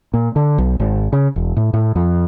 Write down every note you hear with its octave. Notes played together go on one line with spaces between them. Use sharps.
A#2
D3
B1
G#1
C#3
E1
A2
A2
F2